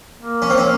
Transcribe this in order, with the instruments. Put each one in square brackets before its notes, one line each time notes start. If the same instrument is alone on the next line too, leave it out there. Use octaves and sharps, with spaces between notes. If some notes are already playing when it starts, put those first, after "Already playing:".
[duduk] A#3
[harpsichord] C#4
C4
C#4